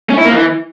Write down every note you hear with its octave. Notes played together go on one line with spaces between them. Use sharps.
C#4
E4
A#3
E3